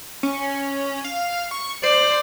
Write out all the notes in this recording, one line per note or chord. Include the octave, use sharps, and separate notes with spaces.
C#4
F5
C#6
C5 D5